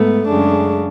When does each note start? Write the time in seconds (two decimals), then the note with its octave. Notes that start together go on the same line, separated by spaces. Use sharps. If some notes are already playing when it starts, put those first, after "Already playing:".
Already playing: G#2 A3 B3
0.27 F#2 C#3 G#3 D4